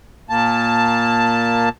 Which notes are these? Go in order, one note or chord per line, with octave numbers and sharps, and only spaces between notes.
A#2 A#3 A5